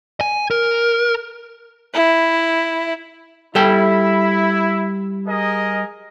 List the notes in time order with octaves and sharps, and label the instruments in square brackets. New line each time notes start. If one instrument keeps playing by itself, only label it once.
[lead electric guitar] G#5
A#4
[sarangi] E4
[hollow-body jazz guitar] G3 A4 G5 [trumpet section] E4
[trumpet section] G#4 A#4 D#5